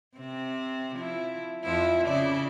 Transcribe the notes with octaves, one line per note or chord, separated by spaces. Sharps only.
C3 C4
F3 E4
F2 F3 E4
C#3 E4 D5